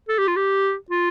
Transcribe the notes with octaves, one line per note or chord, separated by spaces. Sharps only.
A4
G4
F4
G4
F4